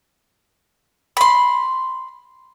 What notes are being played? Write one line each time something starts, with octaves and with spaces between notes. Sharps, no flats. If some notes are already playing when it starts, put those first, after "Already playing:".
B5 C6